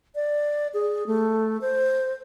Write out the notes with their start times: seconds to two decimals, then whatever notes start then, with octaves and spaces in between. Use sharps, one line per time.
0.15 D5
0.74 G#4
1.07 A3
1.61 C5